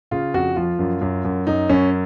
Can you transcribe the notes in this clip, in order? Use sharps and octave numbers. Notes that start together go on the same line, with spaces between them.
C#3 F4
F2 F#4
F3 F4
F#2
F#2
F#2
F#2 D#4
F#2 C#4